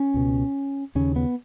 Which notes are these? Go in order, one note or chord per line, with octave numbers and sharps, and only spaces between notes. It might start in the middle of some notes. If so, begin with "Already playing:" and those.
Already playing: C#4
C#2 B2
D#2 C#3 C#4
B3